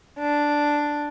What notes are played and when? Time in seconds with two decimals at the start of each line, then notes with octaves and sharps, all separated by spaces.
0.19 D4